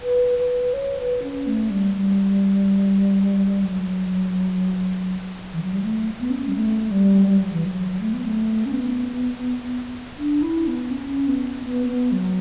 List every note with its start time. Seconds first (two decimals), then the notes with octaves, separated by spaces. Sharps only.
0.01 B4
0.38 B4
0.74 C#5
0.98 B4
1.23 C#4
1.47 A3
1.70 G3
1.95 G3
3.64 F#3
5.53 E3
5.62 F#3
5.73 G3
5.83 A3
6.20 B3
6.30 C#4
6.48 G3
6.55 A3
6.91 G3
7.27 G3
7.41 F#3
7.53 E3
7.65 F#3
8.01 A3
8.13 B3
8.25 A3
8.66 C#4
8.73 B3
10.18 D4
10.42 E4
10.67 B3
10.91 C#4
11.28 B3
11.64 B3
11.87 B3
12.12 F#3